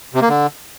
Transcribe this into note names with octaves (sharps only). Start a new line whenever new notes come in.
C3
A#3
D3